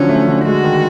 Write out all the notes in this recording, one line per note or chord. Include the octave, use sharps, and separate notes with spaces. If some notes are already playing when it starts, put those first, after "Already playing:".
Already playing: D3 F3 F#3 C#4
A3
D3
G#3 F#4
D#3